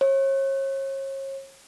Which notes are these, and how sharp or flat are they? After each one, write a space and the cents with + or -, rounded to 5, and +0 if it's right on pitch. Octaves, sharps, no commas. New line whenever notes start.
C#5 -35